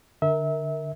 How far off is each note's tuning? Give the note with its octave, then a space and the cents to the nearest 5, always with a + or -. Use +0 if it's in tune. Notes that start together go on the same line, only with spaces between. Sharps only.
D3 +5 A#4 +0 E5 -30